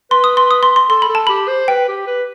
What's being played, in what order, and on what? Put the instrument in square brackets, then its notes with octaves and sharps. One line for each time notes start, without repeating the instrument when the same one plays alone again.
[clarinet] B4 [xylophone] C6
[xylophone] D#6
C6
D#6
C6
C6
[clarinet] A4 [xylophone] C6
[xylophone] B5
[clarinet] A4
[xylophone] A5
[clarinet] G4 [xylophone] B5
[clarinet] C5
[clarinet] B4 [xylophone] G5
[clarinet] G4
B4